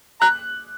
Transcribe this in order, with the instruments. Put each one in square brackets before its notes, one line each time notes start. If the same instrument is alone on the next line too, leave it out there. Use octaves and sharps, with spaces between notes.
[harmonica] A#5 [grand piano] F#6